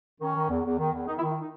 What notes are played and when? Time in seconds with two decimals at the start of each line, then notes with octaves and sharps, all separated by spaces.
0.21 D#3 C#4
0.35 D#3
0.50 E2
0.65 E2
0.79 D#3
0.93 E2
1.07 D#3 D#4
1.18 E4
1.22 D#3
1.29 E4
1.40 D#4